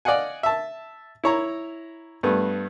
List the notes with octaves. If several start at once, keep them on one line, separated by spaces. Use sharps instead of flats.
D5 D#5 F5 F#5 G#5
E5 A5
E4 C#5 A#5
G2 A3 B3